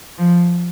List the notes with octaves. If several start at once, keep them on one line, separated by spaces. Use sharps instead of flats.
F3